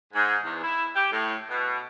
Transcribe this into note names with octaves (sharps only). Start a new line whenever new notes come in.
G#2
E2
E4
G4
A2
B2